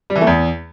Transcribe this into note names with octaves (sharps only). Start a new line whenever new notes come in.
G3
E3
A3
E2